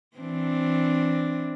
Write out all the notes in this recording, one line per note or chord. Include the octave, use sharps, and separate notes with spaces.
E3 C4 D4